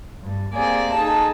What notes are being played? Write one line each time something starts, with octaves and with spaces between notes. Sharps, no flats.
G2
A#3 C4 G4 G#4 D5
D#4 G#4 A4 A5